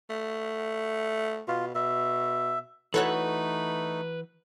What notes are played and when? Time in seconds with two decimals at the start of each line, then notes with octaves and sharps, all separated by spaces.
0.10 A3
1.48 B2 F4
1.75 B2 E5
2.94 E3 A3 D#4 F#4 A4 B4 C#5 F#6